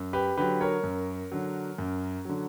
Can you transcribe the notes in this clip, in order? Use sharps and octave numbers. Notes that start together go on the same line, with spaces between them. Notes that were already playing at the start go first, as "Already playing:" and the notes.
Already playing: F#2
G4 B4
D3 F#3 G4 B4
A#4 C#5
F#2
D3 F#3
F#2
D3 F#3